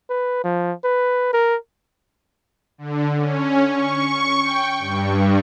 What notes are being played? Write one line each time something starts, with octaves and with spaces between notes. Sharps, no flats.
B4
F3
B4
A#4
D3
C#4
C#6
G5
G2